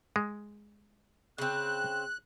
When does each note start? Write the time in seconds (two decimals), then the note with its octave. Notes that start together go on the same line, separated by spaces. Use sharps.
0.16 G#3
1.38 C#3 C4 F#6